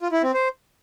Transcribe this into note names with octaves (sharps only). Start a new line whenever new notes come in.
F4
E4
C4
C5